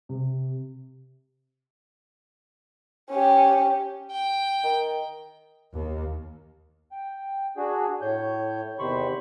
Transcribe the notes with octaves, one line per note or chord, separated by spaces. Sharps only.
C3
C#4 G4
G5
D#3
D#2
G5
D4 F#4 G#4
A2 C#5 G6
E2 C3 D#3 C5 B5 C#6